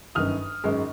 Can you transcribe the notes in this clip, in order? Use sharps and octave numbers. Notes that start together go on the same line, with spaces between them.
G1 F#2 D#3 D#6 F6
G#1 F#2 D#3 G#3